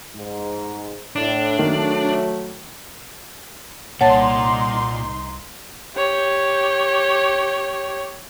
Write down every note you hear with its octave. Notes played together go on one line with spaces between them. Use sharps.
G#2
A2 D4
D#3 F#3 A3
C2 A#2 D#4 C#5 F#5 A5 C6 A6
G4 C#5